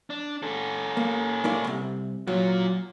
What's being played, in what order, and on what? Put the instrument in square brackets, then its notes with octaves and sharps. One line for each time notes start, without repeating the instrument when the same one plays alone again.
[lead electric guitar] D4
C#4 A4
[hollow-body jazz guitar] A#3
A#3 E4 D5
C2 C3
[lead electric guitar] A#2 F4 [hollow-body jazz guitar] F#3